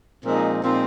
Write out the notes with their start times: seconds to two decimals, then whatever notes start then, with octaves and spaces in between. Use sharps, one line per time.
0.24 A#2 F3 G#3 C4 D#4
0.62 A#2 F3 G#3 C4 D#4